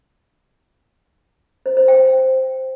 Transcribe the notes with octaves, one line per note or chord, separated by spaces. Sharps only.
C5
C5
G5